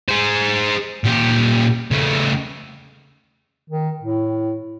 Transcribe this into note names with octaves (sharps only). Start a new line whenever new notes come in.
G#4 C5
A#2 G4
C#3 A3
D#3
A2